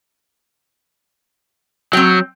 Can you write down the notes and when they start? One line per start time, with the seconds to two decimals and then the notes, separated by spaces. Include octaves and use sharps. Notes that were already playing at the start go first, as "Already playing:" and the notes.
1.93 F#3 C4 G5